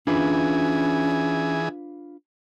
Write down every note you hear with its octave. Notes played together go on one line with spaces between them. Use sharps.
E3 C#4 D4 F4 G#4 B4